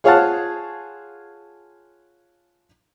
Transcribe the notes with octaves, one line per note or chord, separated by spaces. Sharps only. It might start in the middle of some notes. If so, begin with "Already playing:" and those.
F4 G#4 C#5 F5 F#5 A5